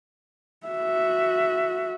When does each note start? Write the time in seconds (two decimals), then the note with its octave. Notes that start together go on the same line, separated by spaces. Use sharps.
0.67 F#4 E5